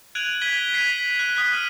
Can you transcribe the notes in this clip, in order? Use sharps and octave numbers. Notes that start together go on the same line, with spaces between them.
F#6 G#6 D7 D#7 F7 F#7
G#6 B6 D#7 G7
G#6 B6 C7 D#7 F7
F#6
D#6 F#6 B6
F6 D#7 F#7